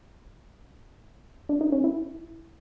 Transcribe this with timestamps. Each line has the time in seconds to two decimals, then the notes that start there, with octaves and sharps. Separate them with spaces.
1.49 D4
1.61 D#4
1.72 C#4
1.84 E4